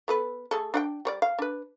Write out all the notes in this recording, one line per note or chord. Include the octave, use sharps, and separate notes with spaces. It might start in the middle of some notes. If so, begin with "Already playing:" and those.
B3 A4 B4
A3 G#4 A4
D4 F#5 G5
G3 C#5 D5
F5
D4 B4